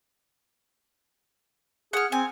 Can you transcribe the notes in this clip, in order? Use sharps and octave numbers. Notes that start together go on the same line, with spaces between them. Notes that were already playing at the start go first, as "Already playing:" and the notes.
G#4 F#5 F6
C4 G#5